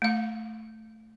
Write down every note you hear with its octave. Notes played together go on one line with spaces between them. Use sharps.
A3 F5